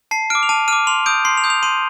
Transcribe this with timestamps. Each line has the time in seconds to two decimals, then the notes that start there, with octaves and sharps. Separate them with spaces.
0.11 A5 C7
0.30 D6 F6 D7
0.43 F7
0.49 A5 D#7
0.68 D6 F6 D#7
0.87 C6 F7
1.06 D#6 G6 D7
1.25 C6 C7
1.38 F7
1.44 D#6 G6
1.50 F7
1.63 C6 D#7